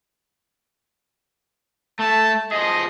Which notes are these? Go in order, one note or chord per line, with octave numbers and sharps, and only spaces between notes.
A3 A5
F3 G#4 D#5